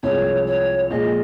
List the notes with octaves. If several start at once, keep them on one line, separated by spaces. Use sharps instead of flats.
C2 C3 F3 G#3 C#5
C#5
A#2 F3 G#3 D#5